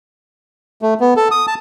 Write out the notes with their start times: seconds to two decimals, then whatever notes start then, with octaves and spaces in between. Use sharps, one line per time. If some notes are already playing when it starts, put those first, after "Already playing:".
0.82 A3
1.00 B3
1.16 A4
1.31 D#6
1.47 A5